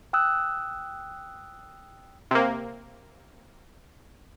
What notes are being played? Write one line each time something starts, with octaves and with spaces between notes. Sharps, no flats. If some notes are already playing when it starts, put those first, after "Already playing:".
G5 D#6 E6 F#6
C3 A#3